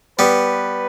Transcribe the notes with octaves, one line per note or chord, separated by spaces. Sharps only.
G3 B3 B4